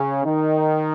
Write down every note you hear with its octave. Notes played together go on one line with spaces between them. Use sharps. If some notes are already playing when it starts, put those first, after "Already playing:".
Already playing: C#3 C#4
D#3 D#4